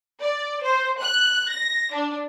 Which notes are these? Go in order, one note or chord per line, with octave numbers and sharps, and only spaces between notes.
D5
C5
F#6
A#6
D4